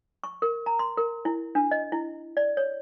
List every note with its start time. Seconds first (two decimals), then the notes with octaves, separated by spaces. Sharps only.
0.24 C#6
0.42 A#4
0.66 A#5
0.79 C6
0.97 A#4
1.25 E4
1.55 D4
1.71 D#5
1.92 E4
2.37 D5
2.57 C#5